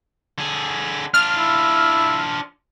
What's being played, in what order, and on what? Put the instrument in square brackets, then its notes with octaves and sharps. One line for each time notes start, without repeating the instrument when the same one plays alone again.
[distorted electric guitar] D3 G#4
[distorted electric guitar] D4 F4 [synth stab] F6
[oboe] E4